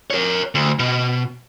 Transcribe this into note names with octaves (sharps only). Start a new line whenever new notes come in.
A#4 C#5
D2
B2